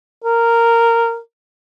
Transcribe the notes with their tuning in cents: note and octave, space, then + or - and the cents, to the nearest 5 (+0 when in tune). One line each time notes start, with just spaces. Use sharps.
A#4 -10